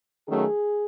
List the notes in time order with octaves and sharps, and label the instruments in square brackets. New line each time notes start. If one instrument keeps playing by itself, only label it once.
[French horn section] D#3 F#3 A3 C#4 G#4